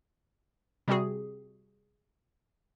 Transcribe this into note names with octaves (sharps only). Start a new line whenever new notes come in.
C3 G3 C4 F#4 G#4